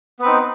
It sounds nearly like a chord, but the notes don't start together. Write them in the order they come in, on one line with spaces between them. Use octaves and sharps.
B3 B4 C4 D#4